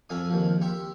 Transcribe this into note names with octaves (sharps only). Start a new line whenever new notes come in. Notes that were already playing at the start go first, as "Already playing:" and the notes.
F2 E5 F5 G#5 D#6
D#2 F3
G4 E5 C6